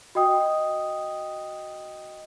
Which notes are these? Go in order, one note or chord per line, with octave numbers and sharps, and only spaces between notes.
F#4 D#5 G5 D#6